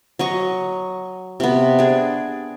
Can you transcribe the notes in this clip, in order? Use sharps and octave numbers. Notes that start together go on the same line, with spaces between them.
F#3 D#5 C#6
C3 B3
D4 G#4